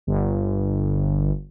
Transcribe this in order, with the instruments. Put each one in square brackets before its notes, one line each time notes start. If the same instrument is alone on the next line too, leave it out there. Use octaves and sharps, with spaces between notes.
[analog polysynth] G1